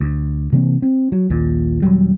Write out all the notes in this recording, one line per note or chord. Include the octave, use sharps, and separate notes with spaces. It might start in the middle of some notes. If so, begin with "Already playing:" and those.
D2
C3 E3 A#3 C4
C4
F#3
A#1 D#2 A#2
D#1 F#2 F#3 G3